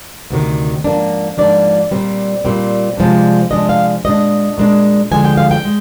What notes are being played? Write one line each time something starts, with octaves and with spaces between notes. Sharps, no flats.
D2 C3 D#3
G#2 F3 A#3 D4
G#2 F3 A#3 D4 D5
A#2 G3 C4
A#2 G3 C4
C3 F3 G#3 D4
C3 F3 G#3 D4 D#5
F5
A#2 G#3 D4 D#5
A#2 G#3 D4
D2 D3 F3 G#3 G#5
G5
F5
G5
G#3